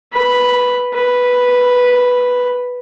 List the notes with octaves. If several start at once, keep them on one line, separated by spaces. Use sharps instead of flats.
B4 B5
B4